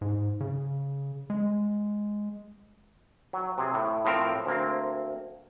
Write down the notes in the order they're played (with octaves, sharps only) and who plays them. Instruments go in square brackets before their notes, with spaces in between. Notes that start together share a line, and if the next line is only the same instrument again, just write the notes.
[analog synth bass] G#2
C#3
G#3
[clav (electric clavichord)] F#3
C3 C4 G#4
A2
A2 F3 C4 A#4
D2 A#3 C4